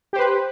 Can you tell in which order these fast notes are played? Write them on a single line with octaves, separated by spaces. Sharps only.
G4 C5 B4